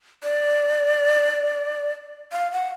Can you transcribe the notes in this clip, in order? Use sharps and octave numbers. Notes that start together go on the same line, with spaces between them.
D5
F5
F#5